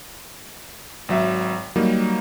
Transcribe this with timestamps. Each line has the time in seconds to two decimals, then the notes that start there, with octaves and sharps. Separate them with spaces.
1.09 G#1 F#3 E5
1.76 F#3 G3 A#3 D#4